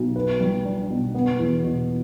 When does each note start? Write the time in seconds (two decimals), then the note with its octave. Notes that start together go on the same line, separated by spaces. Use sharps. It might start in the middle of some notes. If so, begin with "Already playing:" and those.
Already playing: B1
0.16 B4
0.41 G3
0.65 D4
0.89 B2
1.14 B3
1.39 E2
1.64 B2